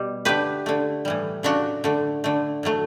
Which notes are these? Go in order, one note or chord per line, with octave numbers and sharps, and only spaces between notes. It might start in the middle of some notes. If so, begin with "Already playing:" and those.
Already playing: B2 G3 G4
D3 A3 G4 B4
D3 A3
A2 E3 G3
C#3 F#3 A3 D4 F#4
D3 A3
D3 A3
A2 F#3 A3